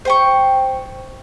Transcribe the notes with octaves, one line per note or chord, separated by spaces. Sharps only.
C5 G5 C#6